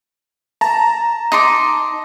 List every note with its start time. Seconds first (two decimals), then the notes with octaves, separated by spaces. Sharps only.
0.61 A5 A#5
1.32 D#4 C6 D6